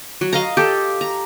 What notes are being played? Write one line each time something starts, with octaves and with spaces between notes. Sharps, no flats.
F#3
D#5 F5 A#5
G4 A4
A#5